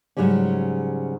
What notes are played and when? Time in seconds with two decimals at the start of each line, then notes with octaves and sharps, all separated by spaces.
0.17 G#2 C#3 F#3 G3 C#4